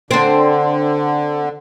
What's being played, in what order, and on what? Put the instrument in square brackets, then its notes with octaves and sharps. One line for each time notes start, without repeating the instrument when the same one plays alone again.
[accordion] D3 [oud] C4 D4